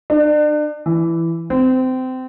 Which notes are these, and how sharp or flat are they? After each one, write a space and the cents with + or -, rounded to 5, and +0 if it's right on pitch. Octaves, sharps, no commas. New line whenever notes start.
D4 +35
E3 +10
C4 -25